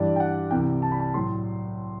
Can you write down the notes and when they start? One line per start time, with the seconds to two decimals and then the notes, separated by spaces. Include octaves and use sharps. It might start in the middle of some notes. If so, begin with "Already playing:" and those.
Already playing: G2 E3 G3 D5
0.16 G5
0.20 F#5
0.51 C2 C3 E3 G5
0.82 A5
0.92 B5
1.00 A5
1.14 A2 F#3 C6